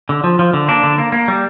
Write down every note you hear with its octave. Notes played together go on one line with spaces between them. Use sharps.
D3
F3
F3
D3
A#3 D4
D3
A#3
A#3
G3